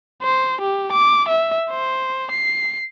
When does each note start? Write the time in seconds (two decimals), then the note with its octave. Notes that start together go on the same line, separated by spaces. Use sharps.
0.22 C5
0.61 G4
0.92 D6
1.28 E5
1.71 C5
2.31 C7